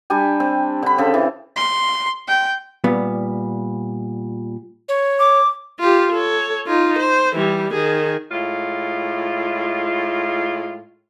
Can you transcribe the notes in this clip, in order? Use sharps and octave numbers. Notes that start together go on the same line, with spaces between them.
G3 D4 G4 G#5
C4
D3 B5
C#3 C4 A4
E3
C6
G5
A#2 G3 B3
C#5
D6
F4 G4
A4 C#5
D#4 F4
C5
E3 G3
D#3 G#4
A2 G#3 F4